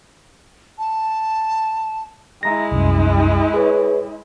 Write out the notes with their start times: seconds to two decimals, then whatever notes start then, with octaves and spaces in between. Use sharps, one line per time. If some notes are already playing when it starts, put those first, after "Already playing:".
0.78 A5
2.43 G#3 E4 E5 A#5 A#6
2.72 C2 F#2
3.54 G#4 B4 C#5